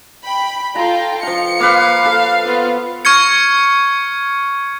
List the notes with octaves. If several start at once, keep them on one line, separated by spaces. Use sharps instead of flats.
G5 B5
F4 A4 G5 A#5
F3 F5 C#7
A#3 B4 F5
A4
B3 F4
C#6 F6 G#6 C#7